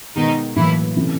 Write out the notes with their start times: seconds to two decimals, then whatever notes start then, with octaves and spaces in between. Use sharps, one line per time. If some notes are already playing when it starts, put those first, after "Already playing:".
0.16 B2 D#3 G#3 B3 D#4
0.56 A2 E3 F#3 A#3 E4
0.96 C3 E3 A3 C#4